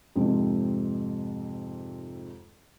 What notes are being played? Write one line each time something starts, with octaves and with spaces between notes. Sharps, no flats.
F2 G#2 C3